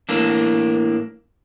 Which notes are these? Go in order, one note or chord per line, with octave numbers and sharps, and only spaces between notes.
A2 E3 A#3 D4